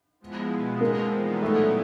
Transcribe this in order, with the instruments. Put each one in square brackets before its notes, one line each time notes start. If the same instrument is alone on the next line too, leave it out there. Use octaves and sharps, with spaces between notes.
[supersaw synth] F3 G#3 B3 E4
B2 G#3 B3
[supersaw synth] F3 G#3 C4 [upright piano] A#3
[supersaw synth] E3 G3 B3 D#4
[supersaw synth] A#2 F#3 B3 E4 [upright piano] A3